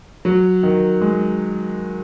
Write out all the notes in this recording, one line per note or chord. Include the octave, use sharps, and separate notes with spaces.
F#3
D#3
G#3